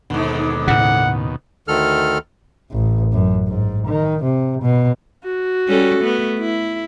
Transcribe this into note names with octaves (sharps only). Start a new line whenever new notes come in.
D#2 G#2 B2 D3
A2 C#3 F#5
D2 D#3 A4 F6
A1
F#2
G#2
D#3
C3
B2
F#4
G3 C#4 A4
A3 B3
E4